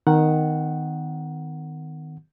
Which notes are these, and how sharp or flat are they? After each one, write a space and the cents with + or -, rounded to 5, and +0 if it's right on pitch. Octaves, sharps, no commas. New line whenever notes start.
D#3 +0 B3 +40 F#5 +0